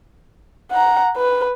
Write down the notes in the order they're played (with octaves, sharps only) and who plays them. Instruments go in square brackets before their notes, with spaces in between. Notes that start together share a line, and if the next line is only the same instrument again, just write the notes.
[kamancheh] F#5 A#5
B4